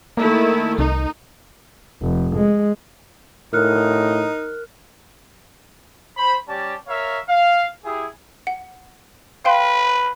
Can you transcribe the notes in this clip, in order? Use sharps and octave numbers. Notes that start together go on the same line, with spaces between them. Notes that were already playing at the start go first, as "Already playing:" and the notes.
D#3 A3 A#3 E4
C2 D#4
F1
G#3
A2 D#4 A#4 F6 F#6
C5 B5
G3 C#4 G4 D5 A5
A#4 C#5 E5 F5
F5
E4 G4 G#4
F#5
B4 F5 G5 C6